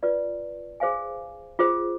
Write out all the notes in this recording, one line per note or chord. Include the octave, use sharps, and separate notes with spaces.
F4 B4 D5
G#4 C5 F5 G#5
F4 G#4 C5